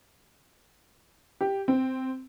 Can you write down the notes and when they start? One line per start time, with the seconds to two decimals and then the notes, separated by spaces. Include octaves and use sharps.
1.41 G4
1.68 C4